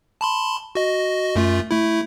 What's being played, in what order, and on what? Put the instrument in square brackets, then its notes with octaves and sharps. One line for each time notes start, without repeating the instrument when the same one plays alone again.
[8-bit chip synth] A5 B5 C6
F#4 D#5
F#2 A3 F4
A3 E4